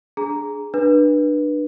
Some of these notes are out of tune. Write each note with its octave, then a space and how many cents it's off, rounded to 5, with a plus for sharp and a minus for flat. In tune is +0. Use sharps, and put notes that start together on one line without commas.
D4 +0 G#4 +10 A#5 +0
D4 +25 B4 -20